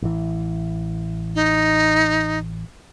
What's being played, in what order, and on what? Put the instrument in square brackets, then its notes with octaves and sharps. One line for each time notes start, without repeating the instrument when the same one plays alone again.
[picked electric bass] A1 E3
[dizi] D#4